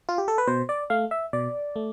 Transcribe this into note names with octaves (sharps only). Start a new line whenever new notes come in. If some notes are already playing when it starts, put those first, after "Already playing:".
F4
G4
A4
B4
B2 C5
D5
A3 F5
E5
B2 D5
A3